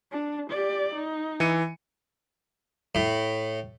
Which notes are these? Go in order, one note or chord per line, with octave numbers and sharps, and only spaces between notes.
D4
G4 D5
D#4
E3 C#7 D#7
A2